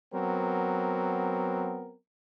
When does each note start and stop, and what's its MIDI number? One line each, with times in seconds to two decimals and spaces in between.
0.12 1.94 54
0.12 1.94 59
0.12 1.94 60
0.12 1.94 70